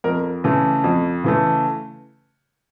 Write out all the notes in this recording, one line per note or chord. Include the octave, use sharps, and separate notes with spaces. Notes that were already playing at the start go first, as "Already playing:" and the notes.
F2 A#4
C#3 E3 A3
F2
C#3 E3 A3